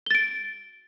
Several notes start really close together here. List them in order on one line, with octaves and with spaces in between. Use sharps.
G7 A6 D7